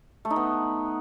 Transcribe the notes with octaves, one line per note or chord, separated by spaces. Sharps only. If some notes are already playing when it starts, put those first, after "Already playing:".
A3
D#4
B3